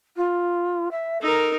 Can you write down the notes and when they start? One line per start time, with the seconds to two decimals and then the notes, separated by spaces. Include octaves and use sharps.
0.16 F4
0.91 E5
1.21 D#4 A4 A#4